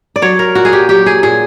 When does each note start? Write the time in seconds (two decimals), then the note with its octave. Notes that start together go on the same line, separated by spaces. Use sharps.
0.16 D5
0.22 F#3 C#5
0.39 A#4
0.55 A#2 F#4
0.65 G#4
0.73 G4
0.89 F#3 G4
1.06 G#4
1.23 A#2 G#4